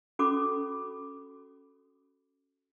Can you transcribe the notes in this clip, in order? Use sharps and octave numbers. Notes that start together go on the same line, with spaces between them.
C#4 F#4 A4 B5 D6